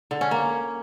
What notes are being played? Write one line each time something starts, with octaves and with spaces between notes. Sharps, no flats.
D3
C#4
A#3